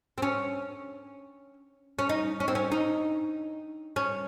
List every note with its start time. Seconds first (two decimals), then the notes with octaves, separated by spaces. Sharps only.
0.18 C4
0.22 C#4
1.99 C#4
2.09 D#4
2.40 C#4
2.48 C4
2.55 C#4
2.72 D#4
3.96 C#4